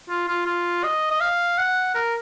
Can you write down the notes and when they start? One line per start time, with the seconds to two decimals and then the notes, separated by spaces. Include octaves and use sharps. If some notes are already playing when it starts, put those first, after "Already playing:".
0.09 F4
0.28 F4
0.46 F4
0.84 D#5
1.11 D#5
1.21 F5
1.58 F#5
1.95 A#4